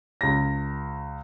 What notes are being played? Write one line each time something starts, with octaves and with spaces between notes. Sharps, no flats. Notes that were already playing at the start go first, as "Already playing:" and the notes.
C#2 A#6